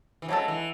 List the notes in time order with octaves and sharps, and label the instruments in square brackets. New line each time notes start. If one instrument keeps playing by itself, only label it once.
[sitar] E3
[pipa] C#3 G#3 D#4 A4 [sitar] F#3
[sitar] E3